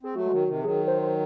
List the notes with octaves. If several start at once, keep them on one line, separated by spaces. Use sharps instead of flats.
C4 G#4
F#3 A3 F#4
G#3
D#3 F#3
C3 D#3
E3
D#3 F#3 G#4
C5
C5